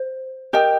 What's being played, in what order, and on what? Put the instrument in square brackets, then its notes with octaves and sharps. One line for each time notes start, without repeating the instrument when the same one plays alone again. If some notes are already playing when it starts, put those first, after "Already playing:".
Already playing: [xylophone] C5
[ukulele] G4 D#5 G5 [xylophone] A#4